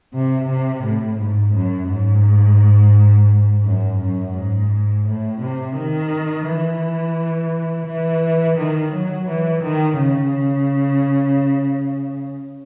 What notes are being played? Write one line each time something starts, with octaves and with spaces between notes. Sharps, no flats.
C3
C3
A2
G#2
F#2
G#2
F#2
F#2
G#2
A2
C3
D#3
E3
E3
D#3
F#3
E3
D#3
C#3